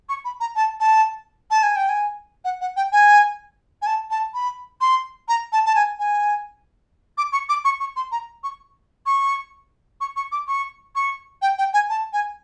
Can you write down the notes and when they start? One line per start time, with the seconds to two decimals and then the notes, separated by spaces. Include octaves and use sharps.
0.09 C#6
0.25 B5
0.40 A#5
0.56 A5
0.80 A5
1.51 A5
1.63 G#5
1.76 G5
1.89 G#5
2.45 F#5
2.61 F#5
2.76 G5
2.92 G#5
3.82 G#5
3.87 A5
4.11 A5
4.34 B5
4.81 C6
5.28 A#5
5.52 A5
5.66 A5
5.75 G#5
5.99 G#5
7.18 D6
7.32 C#6
7.49 D6
7.65 C#6
7.80 C#6
7.96 C6
8.12 A#5
8.43 C#6
9.06 C#6
10.01 C#6
10.16 C#6
10.32 D6
10.48 C#6
10.95 C#6
11.42 G5
11.58 G5
11.73 G#5
11.89 A5
12.13 G#5